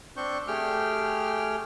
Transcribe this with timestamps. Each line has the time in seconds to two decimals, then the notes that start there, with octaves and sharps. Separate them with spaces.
0.17 C4 D4 C#6 G6
0.47 A3 G4 G#4 G5 F6